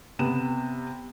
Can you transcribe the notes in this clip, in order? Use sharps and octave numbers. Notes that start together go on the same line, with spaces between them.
C3 B3 E7